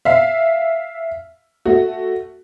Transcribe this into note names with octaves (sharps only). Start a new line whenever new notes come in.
E5 F5
A3 F#4